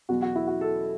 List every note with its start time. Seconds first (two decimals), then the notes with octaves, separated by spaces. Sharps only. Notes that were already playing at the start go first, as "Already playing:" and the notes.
0.09 E2 B2 F#3 F#4
0.22 F#4
0.36 E4
0.47 F#4
0.61 A4